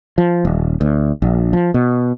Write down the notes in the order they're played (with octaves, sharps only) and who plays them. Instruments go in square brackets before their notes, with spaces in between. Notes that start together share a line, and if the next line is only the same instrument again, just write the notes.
[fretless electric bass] F3
D#1
D2
A#1
F3
B2